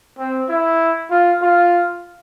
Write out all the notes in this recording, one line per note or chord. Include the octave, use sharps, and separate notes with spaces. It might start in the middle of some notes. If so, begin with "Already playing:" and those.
C4
E4
F4
F4